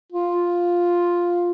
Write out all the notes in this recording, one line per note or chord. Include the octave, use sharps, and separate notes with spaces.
F4